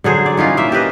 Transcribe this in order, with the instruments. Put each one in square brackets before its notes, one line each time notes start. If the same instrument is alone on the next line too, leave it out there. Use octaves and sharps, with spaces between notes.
[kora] D3 F#3 G#4 C5
D5
E3 C#4 D#4 F4
A#3 E5
G4 A#4 B4 D#5